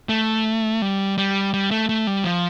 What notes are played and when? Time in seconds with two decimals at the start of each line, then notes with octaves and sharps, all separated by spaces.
0.09 A3
0.82 G3
1.18 G3
1.54 G3
1.71 A3
1.89 A3
2.07 G3
2.25 F3